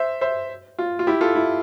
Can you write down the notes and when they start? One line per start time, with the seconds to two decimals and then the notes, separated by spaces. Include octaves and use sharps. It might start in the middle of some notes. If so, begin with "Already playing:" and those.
Already playing: C5 E5
0.21 C5 E5
0.78 F4
0.99 F4
1.07 E4 G4
1.21 F4 A4
1.35 E4